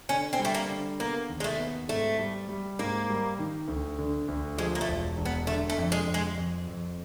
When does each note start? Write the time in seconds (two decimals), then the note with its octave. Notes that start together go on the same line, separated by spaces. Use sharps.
0.09 D3 C#4
0.33 C4
0.39 G3
0.45 A3
0.54 A#3
0.69 D3
1.00 A#3 B3
1.29 D#2
1.40 G#3
1.44 A3
1.59 B3
1.89 G#2 A3
2.19 G3
2.49 G3
2.79 G#2 A#3
3.09 G3
3.39 D#3
3.68 D2
3.98 D3
4.28 D2
4.57 F3 G#3
4.75 A#3
4.81 A3
4.88 E1
5.17 E1
5.25 B3
5.47 D3 A3
5.70 A3
5.78 F2
5.92 G#3
6.08 F2
6.14 G#3
6.37 F2
6.68 F2